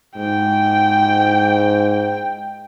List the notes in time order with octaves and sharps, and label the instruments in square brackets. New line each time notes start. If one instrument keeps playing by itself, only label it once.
[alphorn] G#2 [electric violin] G5